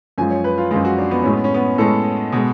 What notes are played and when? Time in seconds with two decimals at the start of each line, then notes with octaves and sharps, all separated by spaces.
0.18 F#2 F3 G#3 G#5
0.31 C#5
0.44 B4
0.58 F4
0.71 F#2 F3 G#3 F4
0.85 F#4
0.98 D4
1.11 B3
1.23 A2 G#3 C#4
1.33 B3
1.44 C#4
1.54 B3
1.78 A2 G#3 A4
2.32 B2 G#3